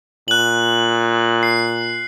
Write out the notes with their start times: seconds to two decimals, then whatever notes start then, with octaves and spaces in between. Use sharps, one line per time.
0.28 A#2 F#6 F#7
1.43 C7